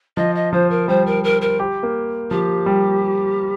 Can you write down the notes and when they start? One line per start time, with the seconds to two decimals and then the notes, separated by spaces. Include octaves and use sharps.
0.17 F3 D#5
0.35 D#5
0.53 F3 C5
0.70 A#4
0.88 G3 C5
1.06 A#4
1.24 A#4
1.41 A#4
1.59 G4
1.83 A#3
2.31 F3 G4
2.66 G3